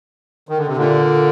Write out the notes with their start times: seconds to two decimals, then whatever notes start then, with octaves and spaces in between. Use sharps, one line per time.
0.49 D#3
0.58 D3
0.67 C3
0.77 A#2 D3